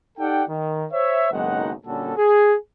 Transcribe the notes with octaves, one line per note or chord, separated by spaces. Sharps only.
D#4 G4 A4 D5 F#5 G5
D#3
C5 C#5 E5
F#1 B1 D#3 G#3 D#4 F#5
A#2 D3 G3 C#4 F#4 A4
G#4